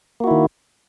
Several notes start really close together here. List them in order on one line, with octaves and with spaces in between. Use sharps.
A#3 F#4 E4 D#3